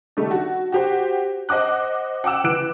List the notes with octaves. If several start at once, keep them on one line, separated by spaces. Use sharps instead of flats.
D#3 G3 A3 D4
F#4
F#4 G4 C5
C5 D#5 F#5 D6 F#6
F#5 G5 D6 E6 E7
E3 F#6 D7